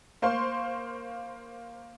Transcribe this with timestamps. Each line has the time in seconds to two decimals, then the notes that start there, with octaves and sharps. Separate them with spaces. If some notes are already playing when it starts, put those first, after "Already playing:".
0.22 A#3 C5 F5 C6 C#6